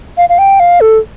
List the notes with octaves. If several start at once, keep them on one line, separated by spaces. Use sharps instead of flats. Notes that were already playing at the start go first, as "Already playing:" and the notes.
F5
F5
G5
F5
A4